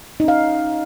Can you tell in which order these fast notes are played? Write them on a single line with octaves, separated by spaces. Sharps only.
D#4 C#4 F5